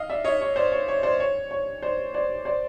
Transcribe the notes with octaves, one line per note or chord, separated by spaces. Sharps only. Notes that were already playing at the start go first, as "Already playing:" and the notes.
Already playing: D#5 F5
D5 E5
C#5 D#5
C#5
C5 D5
C#5
C#5
C5 D5
C#5
C#5
C5 D5
C5 D5
C5 D5